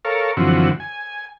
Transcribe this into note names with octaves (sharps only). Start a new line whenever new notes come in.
A4 A#4 C#5 F5
F#2 D3 E3 F3 C4 F#4
G#5